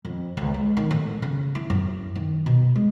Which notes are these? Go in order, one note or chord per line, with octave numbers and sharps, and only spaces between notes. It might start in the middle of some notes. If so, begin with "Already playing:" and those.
F2
C#2
G#3
D#3
A1
C#3
E4
F#2
D#3
B2
G#3